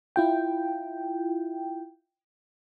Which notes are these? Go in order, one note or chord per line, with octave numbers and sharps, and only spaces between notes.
E4 F4 G5